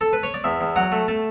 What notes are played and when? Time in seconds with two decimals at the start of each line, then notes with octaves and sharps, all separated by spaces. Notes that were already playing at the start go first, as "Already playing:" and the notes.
0.01 A4
0.13 B4
0.23 C#5
0.34 D5
0.44 E2 E5
0.61 E2
0.76 F#3 F#5
0.92 A3
1.08 A3 A5